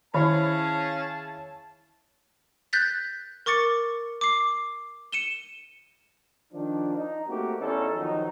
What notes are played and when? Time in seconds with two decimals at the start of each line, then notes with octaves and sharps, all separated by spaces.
0.14 D#3 C#4 E4 G#4 C#5 F5 A5
2.73 F#6 G6 A6 B6
3.46 A#4 C#6 D6 A6 C#7
4.21 D6 C7
5.12 C#7 D#7 E7 G7
6.52 D#3 F3 D4
6.94 D#4
7.28 A3 A#3 C4 F#4 G4
7.59 E2 C#4 D#4 A4
7.95 D#3 F3 F#3 D#4